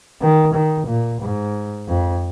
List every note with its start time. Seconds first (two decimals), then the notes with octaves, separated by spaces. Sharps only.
0.21 D#3
0.54 D#3
0.88 A#2
1.22 G#2
1.88 F2